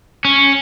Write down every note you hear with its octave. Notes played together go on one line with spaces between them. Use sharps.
C#4